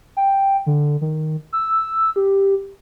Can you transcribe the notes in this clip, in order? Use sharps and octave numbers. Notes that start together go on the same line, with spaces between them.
G5
D3
D#3
E6
G4